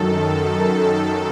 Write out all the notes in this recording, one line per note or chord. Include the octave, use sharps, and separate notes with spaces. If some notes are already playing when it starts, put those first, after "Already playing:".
Already playing: F#2 D#3 A4